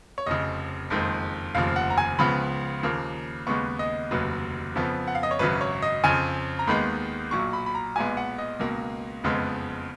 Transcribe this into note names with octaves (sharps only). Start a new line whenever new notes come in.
C#5
F1 F2 C#3 D#5
F#1 F2 D#3 G#3
F1 D#2 C#3 F3 F5
F#5
A#5
G#5
C#2 C#3 F3 B3 B5
D#2 C#3 F3 A#3
D#2 C#3 G#3 B3 C#6
D#5
F1 D#2 C#3 F#3 B4
F2 C#3 F3 B3
F#5
F5
D#5
C#5
G#1 F#2 C#3 F#3 B4
C#5
D#5
F2 C#3 F3 G#5
A#5
D#2 D#3 G#3 B3 B5
B1 A#2 F#3 C#6
B5
B5
A#5
B1 A#2 G#3 B3 G#5
F#5
D#5
C#2 B2 A#3
F#1 F2 C#3 G#3 B3